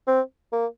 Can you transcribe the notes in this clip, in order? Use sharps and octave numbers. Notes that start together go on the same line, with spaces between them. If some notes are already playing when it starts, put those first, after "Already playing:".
C4
A#3